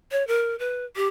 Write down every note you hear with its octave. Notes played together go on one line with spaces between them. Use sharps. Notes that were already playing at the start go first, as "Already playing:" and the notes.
C#5
A#4
B4
G4